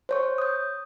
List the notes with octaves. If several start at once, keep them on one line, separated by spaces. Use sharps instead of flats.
C5 C#5 C#6
D#6 G6